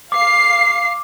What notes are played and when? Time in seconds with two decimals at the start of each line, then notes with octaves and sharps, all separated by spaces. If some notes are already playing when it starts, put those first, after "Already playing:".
0.12 F5 D6 C7